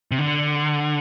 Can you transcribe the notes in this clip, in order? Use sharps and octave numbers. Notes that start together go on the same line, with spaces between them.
C3
D3